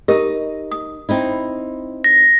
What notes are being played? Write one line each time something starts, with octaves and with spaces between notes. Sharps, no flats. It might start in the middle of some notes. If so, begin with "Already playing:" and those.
D#4 G4 A#4 D#5
D#6
C4 D#4 E4
A#6